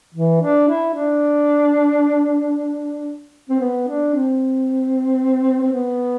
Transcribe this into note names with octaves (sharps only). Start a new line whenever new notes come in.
E3
D4
E4
D4
C4
B3
D4
C4
C4
B3